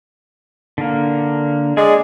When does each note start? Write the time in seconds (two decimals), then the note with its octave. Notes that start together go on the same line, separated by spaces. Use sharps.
0.78 D3 A#3
1.77 G#3 G#4 D5